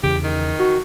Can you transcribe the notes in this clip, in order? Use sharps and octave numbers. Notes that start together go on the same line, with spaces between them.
E2 C#3 G4
D#3
F#4